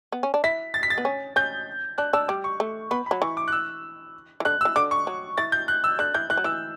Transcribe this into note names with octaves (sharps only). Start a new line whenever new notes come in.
B3
C#4
D4
E4 B6
A6
B6
A6
B3
C#4
C#4 G6
D4 F#6
D4 E6
G3 D6
C#6
A3
B3 B5
B5
F#3
E3 C#6
D6
F#6
E6
E3
D3 F#6
E6
E3
D3 D6
C#6
F#3
E3 A6
G6
F#6
E6
D3 F#6
E3 G6
E3 F#6
F#3
E3 E6